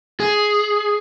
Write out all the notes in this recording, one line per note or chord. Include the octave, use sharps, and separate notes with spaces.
G#4